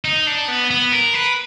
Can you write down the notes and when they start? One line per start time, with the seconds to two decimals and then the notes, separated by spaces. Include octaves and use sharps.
0.05 D#4
0.27 D4
0.48 B3
0.71 B3
0.92 A#4
1.14 B4